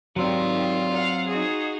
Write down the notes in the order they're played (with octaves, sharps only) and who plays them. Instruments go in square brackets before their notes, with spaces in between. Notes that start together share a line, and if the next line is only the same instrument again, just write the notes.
[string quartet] G#2 D#3 G3 [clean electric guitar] F#3 C4 [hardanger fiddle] F4
[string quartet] F5 F#5
D#4 F#4 G#4